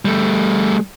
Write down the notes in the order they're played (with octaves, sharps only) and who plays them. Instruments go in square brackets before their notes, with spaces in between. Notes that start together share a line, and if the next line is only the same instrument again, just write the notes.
[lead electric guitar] G3 A3